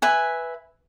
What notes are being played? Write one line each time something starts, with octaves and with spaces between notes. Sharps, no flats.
B4 E5 G#5